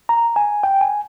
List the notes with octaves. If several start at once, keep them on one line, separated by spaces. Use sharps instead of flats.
A#5
G#5
G5
G#5